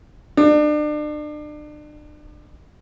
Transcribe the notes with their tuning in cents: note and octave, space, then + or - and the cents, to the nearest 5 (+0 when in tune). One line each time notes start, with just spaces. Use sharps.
D4 +35